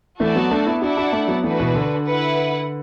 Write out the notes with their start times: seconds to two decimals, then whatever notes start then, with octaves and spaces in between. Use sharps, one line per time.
0.20 E3 A3 F#4 A4 D5 A5
0.35 F#3 B3
0.51 A3 D4
0.66 B3 E4
0.82 D4 E4 F#4 D5 F#5 A5
0.97 D4 F#4
1.13 A3 D4
1.28 F#3 B3
1.44 E3 A3 D4 F#4 B4
1.60 B2 E3
1.75 D3
2.06 E4 B4 F#5